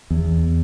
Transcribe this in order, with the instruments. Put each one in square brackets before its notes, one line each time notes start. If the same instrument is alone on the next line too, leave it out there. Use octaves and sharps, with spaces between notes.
[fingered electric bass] E2